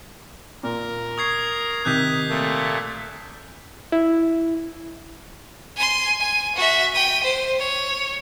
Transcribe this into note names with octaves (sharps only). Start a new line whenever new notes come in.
A#2 A#4
C#6 D#6 G#6 C7
C3 D#3 D#6 F#6 G6 B6
A#2 A3
E4
G#5 C6
G#5
F#4 E5
G5 D#7
C5
C#5